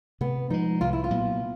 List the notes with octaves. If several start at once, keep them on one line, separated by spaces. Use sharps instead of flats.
C3 B3
F3 G#3 D#4
C2 F4
E4
F4
A#2 F#3 B3